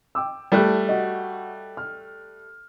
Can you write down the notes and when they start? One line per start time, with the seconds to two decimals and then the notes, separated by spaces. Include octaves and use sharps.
0.15 G5 D6 E6
0.52 G3 A3 A5 F#6
0.89 F#4 D#5
1.77 F6